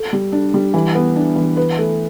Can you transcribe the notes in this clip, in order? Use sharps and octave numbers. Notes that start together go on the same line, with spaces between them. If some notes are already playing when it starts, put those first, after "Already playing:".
Already playing: A4
G3
D4
G3
E3
B3
D4
E3
B4
A3